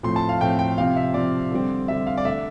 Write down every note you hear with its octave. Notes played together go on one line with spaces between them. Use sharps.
A2 F3 A3 C4 C6
A5
F5
A2 F3 A3 C4 G5
G5
C3 F3 C4 F5
E5
C3 F3 C4 D5
D3 G3 C4
D3 G3 C4 E5
F5
D5
D3 A3 D4 E5